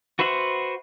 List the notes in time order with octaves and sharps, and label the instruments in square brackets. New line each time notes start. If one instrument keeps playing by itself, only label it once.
[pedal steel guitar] F#4 B4 C5 E5 F#5